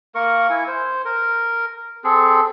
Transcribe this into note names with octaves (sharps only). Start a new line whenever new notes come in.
A#3 A#4 C#6
E4 G#5
C5
A#4
C4 G#4 A4